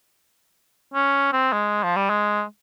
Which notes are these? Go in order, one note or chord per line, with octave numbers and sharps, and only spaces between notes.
C#4
C4
G#3
F3
G3
G#3